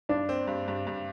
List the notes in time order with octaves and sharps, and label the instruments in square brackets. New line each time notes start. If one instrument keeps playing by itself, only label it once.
[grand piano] G2 [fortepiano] D4
[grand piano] C4
G2
G2
G2